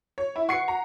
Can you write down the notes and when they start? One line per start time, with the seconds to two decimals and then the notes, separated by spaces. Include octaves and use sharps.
0.18 C#5
0.36 E4
0.49 B4 F#5 C#6 C7 C#7
0.68 A#5